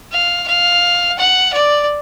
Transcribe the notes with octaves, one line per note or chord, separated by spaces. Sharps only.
F5
F5
F#5
D5